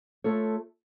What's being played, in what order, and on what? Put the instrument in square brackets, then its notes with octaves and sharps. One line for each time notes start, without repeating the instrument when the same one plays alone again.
[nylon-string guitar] A3 F4 A4 C#5